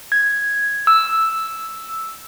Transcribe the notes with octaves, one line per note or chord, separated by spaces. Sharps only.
G#6
E6